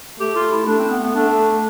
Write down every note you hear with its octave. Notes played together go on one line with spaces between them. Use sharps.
A3 G4
F4
E4
A3 D4
C4
B3
B3
A3 D4